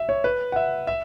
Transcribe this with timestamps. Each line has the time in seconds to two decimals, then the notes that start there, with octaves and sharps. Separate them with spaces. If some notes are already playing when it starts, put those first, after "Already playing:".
Already playing: E5
0.09 C#5
0.24 B4
0.52 F#5
0.56 E5
0.87 E5